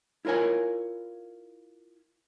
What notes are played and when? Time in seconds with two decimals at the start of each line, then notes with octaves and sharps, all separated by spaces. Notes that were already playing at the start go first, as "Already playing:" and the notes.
0.25 E4 F4 A#4 C#5 G#5